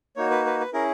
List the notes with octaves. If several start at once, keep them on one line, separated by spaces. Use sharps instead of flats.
A#3 D#4 F#4 C#5
B4
B4
B4
C#4 E4 G#4 A#4